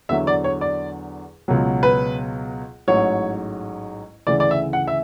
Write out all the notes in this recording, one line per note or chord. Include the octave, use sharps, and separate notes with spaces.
E2 D3 F#3 E5
D5
C#5
D5
C#2 B2 F#3
B4
A1 G#2 F#3 C#5
D2 C#3 E3 D5
D5
E5
F#5
E5